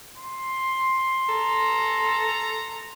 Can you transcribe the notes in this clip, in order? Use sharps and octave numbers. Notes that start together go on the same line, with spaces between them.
C6
A4 A#5